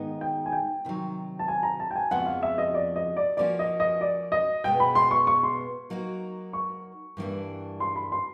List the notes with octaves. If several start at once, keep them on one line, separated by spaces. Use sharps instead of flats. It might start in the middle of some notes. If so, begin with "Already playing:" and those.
Already playing: G#2 D#3 G#3 B3 D#4
G5
G#5
G5
C3 D#3 F#3
A5
G#5
A#5
A5
G5
G#5
F2 C#3 F3 G#3 B3 F#5
F5
E5
D#5
D5
D#5
D5
F3 A#3 C#4 F#4 D5
D#5
D#5
D5
D#5
B2 G#3 B3 G5
B5
C6
C#6
C#6
C6
F#3 A#3 D#4 F#4
C#6
G2 E3 G3 A#3 D4
C6
B5
C6